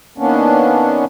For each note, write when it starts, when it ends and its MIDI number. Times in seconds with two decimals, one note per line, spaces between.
0.18 1.05 51
0.18 1.05 58
0.18 1.05 59
0.18 1.05 61
0.18 1.05 62